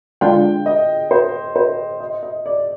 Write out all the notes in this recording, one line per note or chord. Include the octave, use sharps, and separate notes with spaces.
D3 G#3 D4 F4 G5
D#5
C5
C5
D#5
D#5
D5